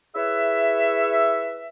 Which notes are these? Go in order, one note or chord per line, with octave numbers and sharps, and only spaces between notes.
E4 G#4 B4 C#5 E5